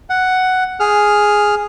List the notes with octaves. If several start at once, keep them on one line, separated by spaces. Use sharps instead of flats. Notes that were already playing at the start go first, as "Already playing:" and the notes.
F#5
G#4 F6